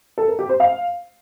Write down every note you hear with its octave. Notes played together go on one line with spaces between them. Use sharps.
A4
A#4
G4
C5
F5